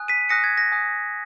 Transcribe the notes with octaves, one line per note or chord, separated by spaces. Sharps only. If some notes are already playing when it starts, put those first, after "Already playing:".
Already playing: G#5 D#6 F#6
B6 D#7
G#5 D#6 F#6 A#6 C#7
G#6
A#6
G#5 D#6 F#6